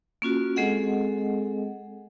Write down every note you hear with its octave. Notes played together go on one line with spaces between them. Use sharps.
A#3 C#4 F4 F#4
G#3 C4 G#4 A4 D#5 F#5